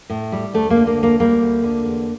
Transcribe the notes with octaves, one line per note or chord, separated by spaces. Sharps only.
A2
G3
D2 A3
A#3
D3
A#3
D2
A#3
G3 A#3
D2
D3
E2